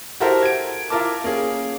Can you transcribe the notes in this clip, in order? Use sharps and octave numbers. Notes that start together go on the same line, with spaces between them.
E4 F#4 G4 A4 A#4 C5
G#6 D7
E4 F4 A#4 A5 D6
A#3 C#4 G#4